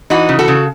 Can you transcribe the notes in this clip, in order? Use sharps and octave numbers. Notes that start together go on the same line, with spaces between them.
E3 D#4 F#4
C#3
F#4 A4
C#3